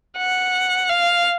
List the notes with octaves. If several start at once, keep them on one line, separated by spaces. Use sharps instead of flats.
F#5
F5